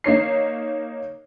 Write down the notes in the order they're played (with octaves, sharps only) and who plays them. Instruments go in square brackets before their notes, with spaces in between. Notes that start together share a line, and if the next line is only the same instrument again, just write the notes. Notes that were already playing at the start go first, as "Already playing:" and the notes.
[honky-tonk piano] A#3 D#4 C#5 C7